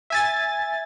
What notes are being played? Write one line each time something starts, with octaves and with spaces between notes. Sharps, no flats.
E5 G#5 A6